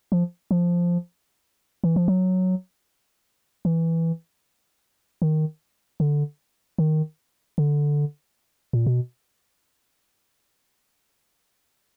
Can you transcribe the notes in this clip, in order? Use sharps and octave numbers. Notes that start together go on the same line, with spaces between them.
F3
F3
E3
F3
F#3
E3
D#3
D3
D#3
D3
A#2
B2